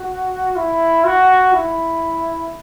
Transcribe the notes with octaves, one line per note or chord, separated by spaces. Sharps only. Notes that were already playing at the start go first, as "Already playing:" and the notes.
Already playing: F#4
E4
F#4
E4